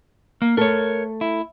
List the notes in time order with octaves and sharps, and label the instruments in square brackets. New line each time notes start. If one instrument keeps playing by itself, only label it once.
[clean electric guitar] A#3
[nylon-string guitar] A3 A4 [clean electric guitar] A#4 C#5
[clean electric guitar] E4